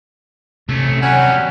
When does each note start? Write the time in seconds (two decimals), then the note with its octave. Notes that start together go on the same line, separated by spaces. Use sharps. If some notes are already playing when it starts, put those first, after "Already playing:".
0.69 C3 A3 C#4
1.02 F#3 G3 C#4 F#5